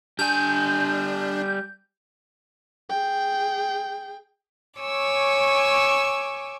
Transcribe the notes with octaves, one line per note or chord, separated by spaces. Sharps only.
G3 D4 G#5 G6
G#4 G5
C#5 G#5 C#6 D6 E6